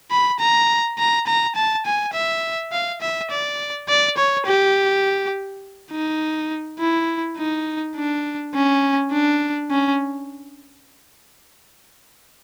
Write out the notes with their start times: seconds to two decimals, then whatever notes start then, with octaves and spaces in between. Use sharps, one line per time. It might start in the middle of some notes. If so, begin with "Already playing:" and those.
0.11 B5
0.39 A#5
0.99 A#5
1.27 A#5
1.56 A5
1.86 G#5
2.14 E5
2.72 F5
3.01 E5
3.31 D5
3.89 D5
4.17 C#5
4.46 G4
5.92 D#4
6.79 E4
7.38 D#4
7.96 D4
8.54 C#4
9.12 D4
9.70 C#4